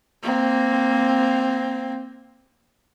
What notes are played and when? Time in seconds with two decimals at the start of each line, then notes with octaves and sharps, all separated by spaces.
0.23 A#3 C4